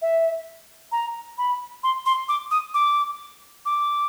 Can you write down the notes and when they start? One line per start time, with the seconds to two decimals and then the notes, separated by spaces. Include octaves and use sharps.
0.02 E5
0.92 A#5
1.38 B5
1.83 C6
2.06 C6
2.28 D6
2.51 D#6
2.74 D6
3.65 D6